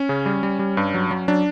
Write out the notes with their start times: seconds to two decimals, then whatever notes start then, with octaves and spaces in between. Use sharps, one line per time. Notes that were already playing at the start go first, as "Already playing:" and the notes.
Already playing: C#4
0.09 C#3
0.26 G3
0.43 G3
0.59 G3
0.77 G2
0.94 F#3
1.11 F#3
1.28 F#3 D4